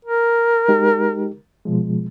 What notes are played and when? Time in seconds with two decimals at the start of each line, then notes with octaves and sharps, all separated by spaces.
0.05 A#4
0.68 G#3 D#4 G4
1.65 B2 F3 G#3